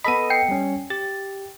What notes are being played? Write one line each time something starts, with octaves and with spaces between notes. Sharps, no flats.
B3 A4 D#5 B5 D#7
G5 C7 C#7
G3 C#4
G4 A6